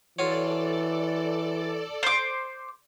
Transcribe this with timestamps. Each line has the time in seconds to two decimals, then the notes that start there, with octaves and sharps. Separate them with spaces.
0.19 E3 F4 F#4 A4 C#5 D5
2.03 C5 D6